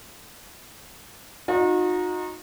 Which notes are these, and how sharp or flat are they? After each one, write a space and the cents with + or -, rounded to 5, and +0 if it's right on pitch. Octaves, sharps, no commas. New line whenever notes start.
D#4 +0 F#4 -40